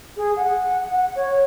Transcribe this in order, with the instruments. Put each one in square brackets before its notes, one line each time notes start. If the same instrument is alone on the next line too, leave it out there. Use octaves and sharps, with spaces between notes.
[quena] G#4
F#5
F#5
C#5